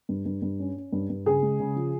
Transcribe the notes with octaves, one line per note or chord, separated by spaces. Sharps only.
G2
G2
G2
C#4
C#4
G2
G2
C#3 G#4
G#3
C#3
F3